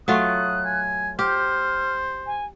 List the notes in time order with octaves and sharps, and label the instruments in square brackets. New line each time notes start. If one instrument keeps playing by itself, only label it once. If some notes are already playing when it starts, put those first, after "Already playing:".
[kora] F#3 A3 F4 [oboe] D#6 [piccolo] F#6
[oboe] G#5
[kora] G4 [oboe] C5 [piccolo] F6
[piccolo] G#5